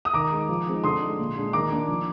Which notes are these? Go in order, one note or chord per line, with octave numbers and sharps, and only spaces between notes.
D#6
D#3 A#5 D6
G#3 D#4
F3
G#3 C4 D#4
D3 C6 D#6
G#3 D#4
A#2
G#3 D4
D#3 A#5 D6
A#3 D4
F3